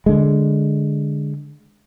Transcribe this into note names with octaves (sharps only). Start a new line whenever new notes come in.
D3 G#3